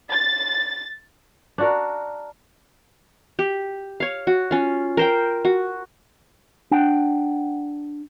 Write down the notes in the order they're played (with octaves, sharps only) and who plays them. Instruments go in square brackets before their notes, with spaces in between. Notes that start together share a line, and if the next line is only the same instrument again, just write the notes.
[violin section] A6
[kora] D4 F#4 A#4
[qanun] G4
C#5 F5
F#4
C#4 F4
A#4 C5 G5
F#4
[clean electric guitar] D4 F#5 G5